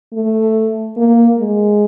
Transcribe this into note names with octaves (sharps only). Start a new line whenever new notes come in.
A3
A#3
G#3